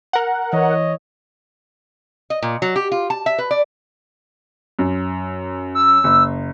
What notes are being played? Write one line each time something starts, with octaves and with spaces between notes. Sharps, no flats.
A#4 F#5
E3 C#5 D#5
D#5
A#2
F#3
G4
F4
A5
E5
B4
D5
F#2
E6
F#1